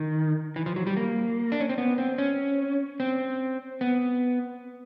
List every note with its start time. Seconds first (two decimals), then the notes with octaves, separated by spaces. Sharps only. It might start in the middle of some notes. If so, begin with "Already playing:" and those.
Already playing: D#3
0.56 E3
0.66 F3
0.76 F#3
0.87 G3
0.97 A#3
1.52 D4
1.60 C#4
1.69 C4
1.78 B3
1.98 C4
2.18 C#4
3.00 C4
3.81 B3